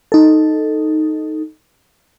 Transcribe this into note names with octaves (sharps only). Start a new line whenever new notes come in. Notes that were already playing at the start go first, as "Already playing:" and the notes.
D#4 A4